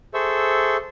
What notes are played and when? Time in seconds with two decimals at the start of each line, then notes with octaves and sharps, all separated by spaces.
0.14 G#4 A4 C5 E5 C#6 E6